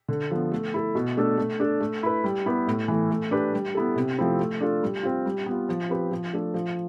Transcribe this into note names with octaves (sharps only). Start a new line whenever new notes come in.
D3
F3 B3
A3
E4 A4
B2
A3 D4 A4
A3
D4 A4
A3
E4 B4
G3
B3 E4 G4 B4
A2
E3 A3
A3
D4 G4 B4
G3
B3 E4 A4
C3
F3 A3 C4 E4
A3
D4 F4 A4
G3
C4 F4
G3
B3
F4
F3
C4 G4 B4
F3
A3 D4 A4
F3